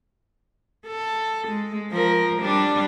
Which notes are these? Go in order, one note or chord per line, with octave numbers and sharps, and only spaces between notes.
A4
G#3
F3 A#4
G3 D4